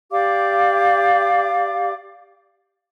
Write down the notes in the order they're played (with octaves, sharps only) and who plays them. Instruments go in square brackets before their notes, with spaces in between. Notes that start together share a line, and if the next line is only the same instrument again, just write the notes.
[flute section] G4 D5 F5 D6